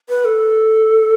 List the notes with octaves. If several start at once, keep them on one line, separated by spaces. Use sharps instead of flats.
B4
A4